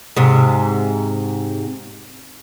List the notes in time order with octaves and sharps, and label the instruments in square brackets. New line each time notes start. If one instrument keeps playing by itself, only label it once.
[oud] G#2 C3